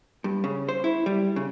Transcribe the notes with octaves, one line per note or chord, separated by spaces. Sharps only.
G2
C#3
C5
E4
G3
C#3